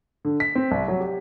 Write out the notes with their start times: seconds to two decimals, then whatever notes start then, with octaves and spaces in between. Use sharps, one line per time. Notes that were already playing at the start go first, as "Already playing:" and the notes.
0.25 D3
0.40 B6
0.55 C4
0.71 C2
0.88 F#3
1.00 G4